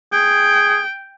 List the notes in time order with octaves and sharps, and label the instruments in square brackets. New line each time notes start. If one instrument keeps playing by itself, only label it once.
[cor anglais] G#4 [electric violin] G5